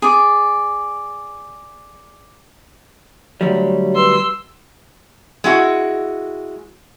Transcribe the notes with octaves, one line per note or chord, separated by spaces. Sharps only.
G#4 D5
D2 F#3 G3 C#5
B4 C6 E6
G#3 E4 F#4